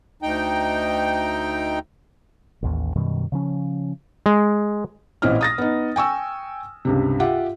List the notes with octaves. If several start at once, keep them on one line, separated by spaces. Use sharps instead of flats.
D2 D#4 G5
A1 D#2
F#2 B2 D#3 G3
C#3 F3 C#4
G#3
A1 A#2 C4 E4 D#5 F6
D#6 A6 A#6
B3 D#4
G5 G#5 C#6 E6
C#2 G2 C3
F4 G4 E5 F#5